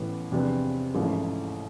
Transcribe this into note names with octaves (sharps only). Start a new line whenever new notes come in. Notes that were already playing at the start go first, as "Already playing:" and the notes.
Already playing: A1 A2 E3 B3
E2 C3 F3 B3 D4
A1 G#2 F3 A3 E4